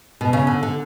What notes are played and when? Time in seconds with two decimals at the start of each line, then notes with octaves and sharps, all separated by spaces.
0.21 B2
0.33 C#3
0.47 D3
0.63 D3